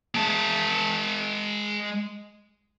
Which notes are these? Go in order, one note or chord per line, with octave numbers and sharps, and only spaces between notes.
G#3 A5